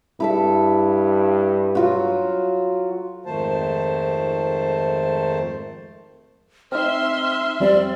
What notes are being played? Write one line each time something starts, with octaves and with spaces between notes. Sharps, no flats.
G2 E4 A4 E5
F#3 F4 F#4
F2 G#2 D#3 A3 C5 A5
C4 D#4 E5 C6 F6
F2 G3 C4 D5